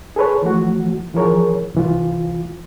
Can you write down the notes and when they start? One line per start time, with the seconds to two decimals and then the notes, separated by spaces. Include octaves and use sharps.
0.16 G#4 A4 B4 C#5
0.42 E3 F3 A3 F#4
1.14 E3 F3 G#4 A#4 C#5
1.74 C2 E3 F4